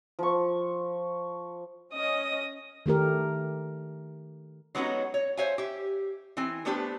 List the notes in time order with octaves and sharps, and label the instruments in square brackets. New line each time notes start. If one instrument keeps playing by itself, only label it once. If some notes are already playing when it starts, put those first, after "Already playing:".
[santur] F3 C#6
[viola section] C#4 D#5 [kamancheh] D#6
[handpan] D#3 A3 G4 A#4
[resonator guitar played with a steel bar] F#3 G#3 B3 C#4 D#4 F#4
C#5
C5 C#5 E5 F5 G#5
G4 E5
E3 C4 G#5
A3 B3 D4 G4 B4 C5